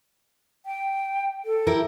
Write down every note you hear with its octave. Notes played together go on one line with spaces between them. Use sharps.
G5
A4
E4 G4 A#4